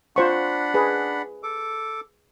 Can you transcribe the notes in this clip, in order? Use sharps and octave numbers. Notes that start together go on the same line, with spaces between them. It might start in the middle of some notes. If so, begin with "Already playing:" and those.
D4 F4 C5 F#5 B5 C#6
G#4 B4
A4 D6